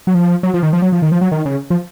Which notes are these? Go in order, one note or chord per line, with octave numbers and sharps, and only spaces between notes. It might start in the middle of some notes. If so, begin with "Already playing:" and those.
F#3
F3
F#3
F3
D#3
F3
F#3
F3
D#3
F3
F#3
D#3
C#3
F3